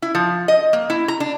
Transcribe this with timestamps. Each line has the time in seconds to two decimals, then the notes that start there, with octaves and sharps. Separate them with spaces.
0.02 E4
0.15 F3
0.48 D#5
0.73 A#3
0.90 E4
1.08 A#5
1.20 D4